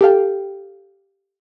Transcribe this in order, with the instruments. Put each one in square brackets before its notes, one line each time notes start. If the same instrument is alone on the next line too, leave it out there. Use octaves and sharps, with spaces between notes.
[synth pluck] G4 A4 F5 G5